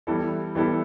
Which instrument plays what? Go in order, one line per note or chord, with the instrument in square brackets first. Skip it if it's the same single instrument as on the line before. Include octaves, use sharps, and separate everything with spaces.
[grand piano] E3 G3 B3 E4 A4
E3 G3 B3 E4 A4